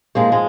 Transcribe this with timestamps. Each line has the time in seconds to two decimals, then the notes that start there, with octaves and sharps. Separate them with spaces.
0.15 G#2 F3 G#3 A#3
0.32 G#3